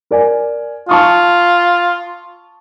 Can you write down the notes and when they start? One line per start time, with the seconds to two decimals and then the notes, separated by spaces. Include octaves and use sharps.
0.11 A#4 D5 G#5
0.89 F4 A5 C#6 D#6